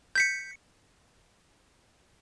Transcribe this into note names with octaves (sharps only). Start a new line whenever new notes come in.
G6 B6 C#7